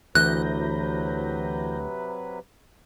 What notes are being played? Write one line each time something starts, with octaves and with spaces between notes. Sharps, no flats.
D2 C3 E3 F#3 B4 F#6 G6 A#6